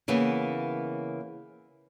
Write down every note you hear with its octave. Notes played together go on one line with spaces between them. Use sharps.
C#3 E3 A#3 B3 C#4